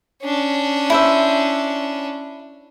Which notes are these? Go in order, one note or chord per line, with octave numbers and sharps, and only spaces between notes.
C#4 D4
E4 C5 E5